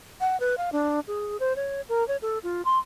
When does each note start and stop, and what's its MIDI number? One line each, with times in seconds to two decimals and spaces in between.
0.21 0.39 78
0.40 0.55 71
0.58 0.70 77
0.72 1.00 62
1.07 1.37 68
1.40 1.56 72
1.56 1.81 73
1.89 2.06 70
2.08 2.17 73
2.22 2.38 69
2.43 2.62 65
2.65 2.78 84